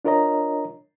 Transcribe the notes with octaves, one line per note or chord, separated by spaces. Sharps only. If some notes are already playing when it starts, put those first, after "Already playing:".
D4 F4 A#4 C#5 D#5 A#5